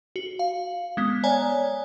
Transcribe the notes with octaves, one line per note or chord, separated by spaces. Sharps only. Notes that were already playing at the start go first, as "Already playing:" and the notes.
F#4
F5
G#3 B3
C#5 D5 G#5 A#5